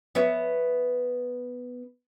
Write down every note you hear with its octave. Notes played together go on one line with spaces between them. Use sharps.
B3 C#5 E5